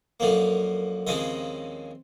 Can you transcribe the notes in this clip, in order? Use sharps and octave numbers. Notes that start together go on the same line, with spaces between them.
F#2 D3 F3 A#3
D#2 C#3 F3 G#3 C4 D#5